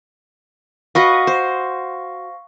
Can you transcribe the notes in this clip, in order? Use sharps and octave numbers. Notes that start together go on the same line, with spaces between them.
F#4 B4 D#5 F5 C#6 A#6
C5